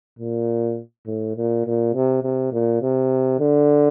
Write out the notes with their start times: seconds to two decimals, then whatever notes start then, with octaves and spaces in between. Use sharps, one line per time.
0.19 A#2
1.06 A2
1.36 A#2
1.66 A#2
1.94 C3
2.23 C3
2.52 A#2
2.82 C3
3.39 D3